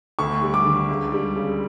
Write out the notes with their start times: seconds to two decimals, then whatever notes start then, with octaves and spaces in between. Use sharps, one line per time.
0.19 D2 C#6
0.42 G3
0.54 D6
0.65 D3
0.89 C#2
1.12 G3
1.36 C#3